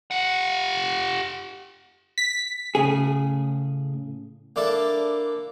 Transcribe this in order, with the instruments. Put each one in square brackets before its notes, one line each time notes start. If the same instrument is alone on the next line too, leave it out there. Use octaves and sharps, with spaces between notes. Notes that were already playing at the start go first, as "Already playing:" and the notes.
[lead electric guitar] G4 F#5
[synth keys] B6
[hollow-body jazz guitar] A2 C#3 G#4
[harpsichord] A#3 D4 E4 A4